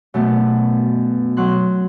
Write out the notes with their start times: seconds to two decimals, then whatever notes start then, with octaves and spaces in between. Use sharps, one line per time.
0.14 F#2 B2 A3 B3
1.37 F#3 C6 F#6